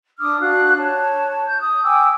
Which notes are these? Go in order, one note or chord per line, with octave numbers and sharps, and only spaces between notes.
D4 D6 D#6 F6
D4 F#4 F5 F#6
C#5 A5
G6
D#6
G5 G#5 D6 E6